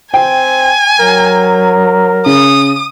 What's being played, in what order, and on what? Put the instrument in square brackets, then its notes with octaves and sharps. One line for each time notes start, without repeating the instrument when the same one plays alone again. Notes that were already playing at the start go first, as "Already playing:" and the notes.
[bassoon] C4 [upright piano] G5 [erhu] G#5
[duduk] F#3 [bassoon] A#4
[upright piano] C#3 [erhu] D#6